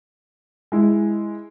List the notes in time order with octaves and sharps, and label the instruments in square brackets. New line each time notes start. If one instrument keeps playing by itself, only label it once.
[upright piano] G#3 E4